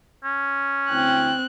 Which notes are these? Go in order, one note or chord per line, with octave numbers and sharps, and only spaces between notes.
C#4
D2 C4 E4 G5 F#6